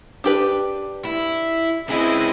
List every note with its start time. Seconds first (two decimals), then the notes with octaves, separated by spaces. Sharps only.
0.24 D4 G4 B4
1.05 E4
1.89 C#2 C4 E4 G#4 D#5